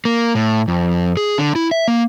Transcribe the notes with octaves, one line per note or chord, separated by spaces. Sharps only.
A#3
A2
F2
G#4
D3
E4
E5
A#3